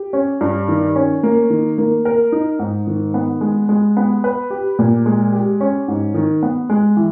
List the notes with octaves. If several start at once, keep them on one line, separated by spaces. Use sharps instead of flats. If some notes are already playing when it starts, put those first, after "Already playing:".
Already playing: G4
C#4
G2
D#3
C#4
A#3
D#3
A#3
A#4
D#4
G#2
D#3
B3
G#3
G#3
B3
B4
G4
A#2
G#3
G4
C#4
G#2
D#3
B3
G#3
E3